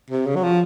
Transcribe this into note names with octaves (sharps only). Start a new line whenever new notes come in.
C3
C#3
F#3
F3